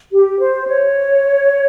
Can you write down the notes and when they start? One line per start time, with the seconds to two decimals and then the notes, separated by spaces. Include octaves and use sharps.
0.11 G4
0.39 C5
0.66 C#5